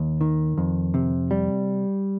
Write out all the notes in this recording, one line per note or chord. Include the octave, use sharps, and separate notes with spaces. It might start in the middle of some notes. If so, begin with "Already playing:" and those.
Already playing: D#2
D#3
F2
C3
G3